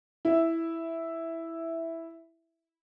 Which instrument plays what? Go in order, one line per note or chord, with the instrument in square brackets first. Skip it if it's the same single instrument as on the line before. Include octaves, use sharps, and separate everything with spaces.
[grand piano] E4 E5